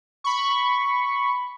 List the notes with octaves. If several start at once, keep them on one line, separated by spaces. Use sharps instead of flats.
B5 C#6